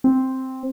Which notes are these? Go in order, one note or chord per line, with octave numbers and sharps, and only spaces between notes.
C4